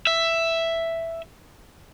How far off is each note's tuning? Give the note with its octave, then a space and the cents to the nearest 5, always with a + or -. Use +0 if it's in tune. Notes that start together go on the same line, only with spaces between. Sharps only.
E5 +5